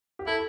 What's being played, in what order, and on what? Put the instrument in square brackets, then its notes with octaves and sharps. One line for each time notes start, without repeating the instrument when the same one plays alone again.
[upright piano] G4
[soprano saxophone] E4 [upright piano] A4